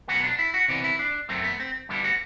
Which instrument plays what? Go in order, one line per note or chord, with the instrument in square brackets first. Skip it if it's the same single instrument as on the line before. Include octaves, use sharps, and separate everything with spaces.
[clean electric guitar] B2 F#3 B3 F#4
D4
E4
F#4
C3 E3 B3 D5
E4
D4
F#2 F#3 A3 C4
B3
C4
G2 D3 G3 B3 E4
F#4